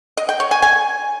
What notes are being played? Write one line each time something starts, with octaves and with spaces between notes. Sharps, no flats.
D#5
G5
C#5
G#5
G#5